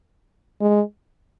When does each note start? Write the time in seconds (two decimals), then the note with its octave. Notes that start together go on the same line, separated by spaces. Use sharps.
0.61 G#3